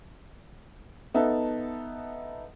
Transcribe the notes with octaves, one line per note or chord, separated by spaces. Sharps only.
B3 D#4 A4 E5 F#5 A5